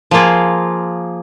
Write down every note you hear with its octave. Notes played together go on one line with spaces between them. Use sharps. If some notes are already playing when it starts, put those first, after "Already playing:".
F3 A#3 F4 G#4